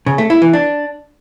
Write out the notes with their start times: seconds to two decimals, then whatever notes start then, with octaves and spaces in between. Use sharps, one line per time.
0.06 C#3
0.18 A3
0.30 E4
0.42 E3
0.53 D4